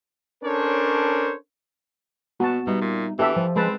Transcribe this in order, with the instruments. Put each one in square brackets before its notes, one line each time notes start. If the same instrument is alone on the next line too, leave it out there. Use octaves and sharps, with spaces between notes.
[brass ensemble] C#4 D4 A4 A#4 C5 C#5
[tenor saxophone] B2 [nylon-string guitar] B3 [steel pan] F#4 A5
[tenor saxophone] B2 [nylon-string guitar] G3 D#4 E5
[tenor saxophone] A#2
[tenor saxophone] E3 [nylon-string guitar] B3 D4 F#4 [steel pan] G4 A4 E5
[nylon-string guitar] F3
[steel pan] G#3 B4 A5 [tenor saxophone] C4